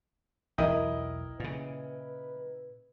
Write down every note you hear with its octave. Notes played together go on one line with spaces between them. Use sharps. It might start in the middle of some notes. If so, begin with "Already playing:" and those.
B1 E2 E3 E4 A#4 D#5 G5 D#6
A#2 C#3 B4